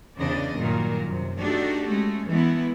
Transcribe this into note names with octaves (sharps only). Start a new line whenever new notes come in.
E2 C#3 B3 D4 D5 D#5
G2 A#2 D#3 F#3 A#4
F#2 C3
A3 D4 D#4 F#4 G4 A4
G#3 A3 C#4
E3 G#3 A3 B3 E4